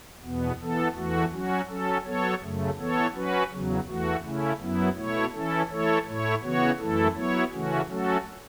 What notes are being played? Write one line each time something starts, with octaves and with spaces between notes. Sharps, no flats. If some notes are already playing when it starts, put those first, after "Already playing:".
E2 B2 B3
E3 B3 A4
E2 E3 A3 F#4
F#3 C#4 F#4
F#3 C#4 A4
F#3 B3 A4 C#5
F#2 C#3 A3
E3 B3 A4 C#5
F#3 C#4 F#4 B4
E2 C#3 F#3
E2 E3 A3 F#4
C#3 A3 C#4 E4
F#2 F#3 B3 E4
B2 A3 E4 C#5
E3 C#4 E4 A4
E3 A3 E4 A4 C#5
A2 A3 E4 C#5
C#3 E3 B3 F#4 C#5
F#2 E3 A3 E4 A4
F#3 B3 E4 C#5
C#3 E3 A3 C#4 F#4
F#3 A3 C#4 F#4 A4